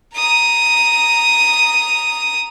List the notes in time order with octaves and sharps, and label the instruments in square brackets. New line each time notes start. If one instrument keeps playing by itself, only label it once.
[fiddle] A#5 D#6